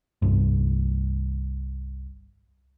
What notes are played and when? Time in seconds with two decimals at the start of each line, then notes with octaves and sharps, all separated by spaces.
0.22 G1 C2 G2